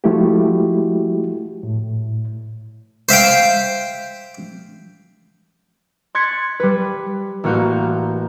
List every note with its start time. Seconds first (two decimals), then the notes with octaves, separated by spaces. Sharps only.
0.04 F3 G#3 A3 E4 F#4 G4
1.63 A2
3.09 C5 E5 F5 G5
6.15 C6 F#6 G#6 A6 B6 C#7
6.60 G3 B4
7.44 A1 A#3 F#4 F5 G6